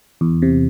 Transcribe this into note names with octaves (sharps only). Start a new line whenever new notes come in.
E2
C3